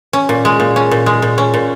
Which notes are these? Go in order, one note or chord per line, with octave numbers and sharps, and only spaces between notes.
C#4
A#2
G#3
A#2
C#4
A#2
G#3
A#2
C#4
A#2